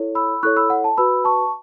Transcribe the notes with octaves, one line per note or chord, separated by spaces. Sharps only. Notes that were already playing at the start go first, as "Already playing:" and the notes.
Already playing: E4 A4 C#5
B5 E6
E4 A4 C#5 C#6 F#6
B5 E6
F#5
A5
F#4 B4 B5 E6
A5 C#6